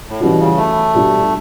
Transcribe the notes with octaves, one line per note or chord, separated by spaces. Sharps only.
A2
B2 E3 G3 C#4 F#4
C#3
A3
B2 G3 D4 F#4